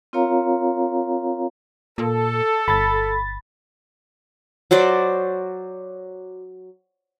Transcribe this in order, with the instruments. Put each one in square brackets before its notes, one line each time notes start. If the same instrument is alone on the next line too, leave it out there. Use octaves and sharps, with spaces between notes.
[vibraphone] C4 F4 A#4 C#5 F5 A#5
[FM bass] A#2 [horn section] A4
[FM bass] G1 [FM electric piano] B5 A6
[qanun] F#3 F#4 C5 D5